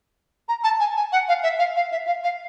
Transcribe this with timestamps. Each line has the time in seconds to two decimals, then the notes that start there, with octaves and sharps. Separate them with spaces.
0.49 A#5
0.64 A5
0.80 G#5
0.97 G#5
1.12 F#5
1.28 F5
1.43 E5
1.59 F5
1.76 F5
1.92 E5
2.07 F5
2.24 F5